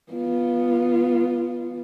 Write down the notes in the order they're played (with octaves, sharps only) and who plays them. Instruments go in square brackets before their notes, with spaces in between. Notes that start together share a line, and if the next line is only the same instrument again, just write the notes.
[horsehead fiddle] B3 F4